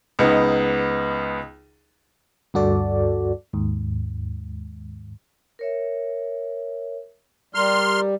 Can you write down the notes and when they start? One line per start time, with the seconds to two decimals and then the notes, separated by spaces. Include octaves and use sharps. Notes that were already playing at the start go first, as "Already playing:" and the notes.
0.19 C#2 B3 D#4
2.54 D2 G2 F#4 A4 D5
3.53 D#2 G#2
5.59 A#4 C#5 E5
7.55 G3 A#4 A#5 C6 F6